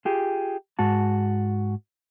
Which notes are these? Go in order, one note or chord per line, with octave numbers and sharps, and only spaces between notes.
F4 G4 G#4
G#2 F#4 A5